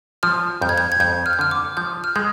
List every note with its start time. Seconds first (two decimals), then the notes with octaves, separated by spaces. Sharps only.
0.23 F3 F6
0.61 F2 G6
0.69 G#6
0.78 G6
0.92 G#6
1.00 F2 G6
1.26 F6
1.33 G6
1.39 D3 F6
1.51 D6
1.77 F3 G6
2.04 F6
2.16 G#3 G6